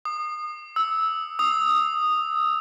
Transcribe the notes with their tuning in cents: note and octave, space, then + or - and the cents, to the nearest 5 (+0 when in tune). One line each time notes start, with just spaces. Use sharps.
D#6 -30
E6 -15
D#6 -10